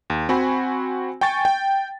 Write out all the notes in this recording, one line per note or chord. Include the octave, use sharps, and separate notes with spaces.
D#2
C4 F#4 G#5 B5
G5 G#5 C#6 A6
G5